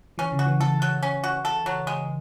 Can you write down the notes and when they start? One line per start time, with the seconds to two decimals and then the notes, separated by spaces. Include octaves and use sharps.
0.18 E3 C#4
0.32 C#3
0.39 F#4
0.46 E3
0.60 E3 A4
0.82 F#3
1.03 C#4
1.24 F#4
1.45 A4
1.66 F#3
1.87 G#3